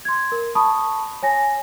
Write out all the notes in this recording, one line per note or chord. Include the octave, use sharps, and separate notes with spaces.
C6 G#6
A#4
A5 B5 C#6 D#6
C#5 G#5 A#6